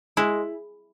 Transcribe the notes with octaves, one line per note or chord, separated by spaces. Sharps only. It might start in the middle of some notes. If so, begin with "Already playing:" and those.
G#3 E4